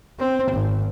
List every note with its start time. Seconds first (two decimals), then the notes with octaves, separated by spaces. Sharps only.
0.19 C4
0.52 G#1